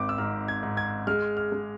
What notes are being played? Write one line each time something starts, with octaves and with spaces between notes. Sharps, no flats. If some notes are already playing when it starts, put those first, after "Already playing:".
Already playing: G#1 C4 D6
E6
G#2 F6
G#6
G#2
G#6
G#3 F6
F6
G#3